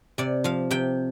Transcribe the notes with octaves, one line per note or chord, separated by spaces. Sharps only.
C3 D5
F3 F5
C3 G5